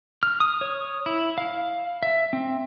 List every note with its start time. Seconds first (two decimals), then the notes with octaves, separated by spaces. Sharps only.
0.23 F6
0.40 D#6
0.61 C#5
1.06 E4
1.38 F5
2.03 E5
2.33 C4